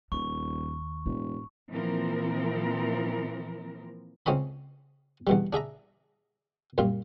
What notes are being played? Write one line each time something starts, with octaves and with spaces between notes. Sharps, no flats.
D#1 D#2 C#6
E1 A2
A#2 E3 F3 C4 A#4
C#2 C4 C#4 D#5 B5
E2 B2 G3
D4 G#4 E5 A#5
F#2 A#2 G3 F4